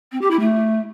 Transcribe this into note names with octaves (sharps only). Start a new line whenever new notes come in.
C4
G4
E4
A3